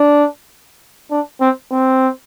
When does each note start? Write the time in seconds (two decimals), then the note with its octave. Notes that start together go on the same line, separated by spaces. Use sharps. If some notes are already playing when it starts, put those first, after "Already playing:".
Already playing: D4
1.11 D4
1.41 C4
1.72 C4